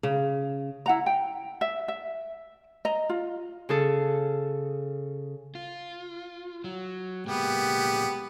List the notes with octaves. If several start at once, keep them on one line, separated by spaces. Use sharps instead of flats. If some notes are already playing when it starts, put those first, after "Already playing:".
C#3
E4 F#5 A#5
G5
E5
E5
D#5 A#5
F4
C#3 G#4 A4
F4
F#3
A#2 G#3 A#3 B3 G4